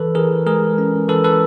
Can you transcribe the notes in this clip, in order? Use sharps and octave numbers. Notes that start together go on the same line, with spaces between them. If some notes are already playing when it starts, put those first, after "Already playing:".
Already playing: E3 A4 B4
E3 G#4 A#4
G#3 G#4 A#4
C#4
E3 A4 B4
A4 B4